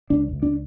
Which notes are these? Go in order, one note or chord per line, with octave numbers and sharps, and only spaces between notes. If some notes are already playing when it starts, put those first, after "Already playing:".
C#2 D4
C#2
D4